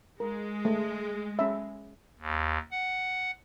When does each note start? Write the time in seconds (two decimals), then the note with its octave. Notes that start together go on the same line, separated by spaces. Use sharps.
0.20 G#3 A#4
0.65 A3
1.39 C#4 E5
2.19 D#2
2.71 F#5